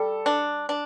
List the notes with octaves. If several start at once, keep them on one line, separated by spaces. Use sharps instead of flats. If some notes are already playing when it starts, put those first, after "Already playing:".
Already playing: G3 A4
D4
D4